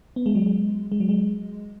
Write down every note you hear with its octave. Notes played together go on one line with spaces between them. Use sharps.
B3
G#3
F#3
G#3
G#3
F#3
G#3